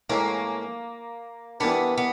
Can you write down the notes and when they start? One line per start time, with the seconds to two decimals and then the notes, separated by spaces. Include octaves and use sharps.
0.09 A2 E3 G#3 A#3 C#4
1.60 E3 G3 A#3 B3 D4
1.98 B3